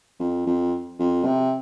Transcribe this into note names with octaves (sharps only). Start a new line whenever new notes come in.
F2
F2
F2
C3